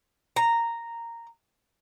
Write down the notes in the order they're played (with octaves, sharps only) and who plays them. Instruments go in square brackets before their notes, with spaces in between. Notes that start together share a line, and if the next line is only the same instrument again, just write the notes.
[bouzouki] A#5